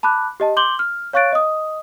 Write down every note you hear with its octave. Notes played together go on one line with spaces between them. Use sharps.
A5 B5 D6 F#6
G4 D#5 A5
C6 D6 G6 F#7 G7
F6
C#5 F5 C#6 F#6 A6 D7
D#5 D#6